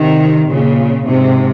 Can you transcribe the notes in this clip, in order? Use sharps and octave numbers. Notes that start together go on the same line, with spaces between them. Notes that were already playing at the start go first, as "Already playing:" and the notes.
Already playing: C3 D#3
A#2 C#3
G#2 C3